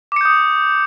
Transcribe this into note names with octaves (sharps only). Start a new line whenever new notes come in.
D6 D#6 G6 C#7